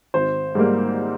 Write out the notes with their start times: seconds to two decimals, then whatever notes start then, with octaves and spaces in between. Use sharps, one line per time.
0.14 G#1 C5
0.55 G#2 G3 A#3